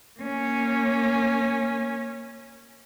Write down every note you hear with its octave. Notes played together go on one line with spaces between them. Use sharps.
A#3 C#4